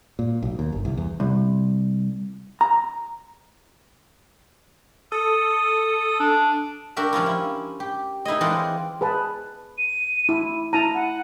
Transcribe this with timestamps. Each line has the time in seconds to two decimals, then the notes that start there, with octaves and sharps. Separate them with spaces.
0.19 A#2
0.43 B1
0.59 D#2
0.72 G1
0.85 C2
0.97 E2
1.20 C2
2.61 A#5
5.12 A4 D#6
6.20 D4
6.96 D4 F#4 G4 A#4 E5
7.13 F3 C#4 E4 F4
7.26 E4
7.80 G4
8.25 D#4 E4 G#4 D#5
8.41 E3 G#3 C4 F4 D5 F#5
9.01 G#4 B4 A5
9.78 D#7
10.29 E4
10.73 E4 A5 A#5 D#7
10.94 F#5